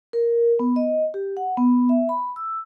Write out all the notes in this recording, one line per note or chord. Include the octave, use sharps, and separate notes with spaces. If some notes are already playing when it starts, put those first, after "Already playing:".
A#4
B3
D#5
G4
F#5
B3
E5
B5
E6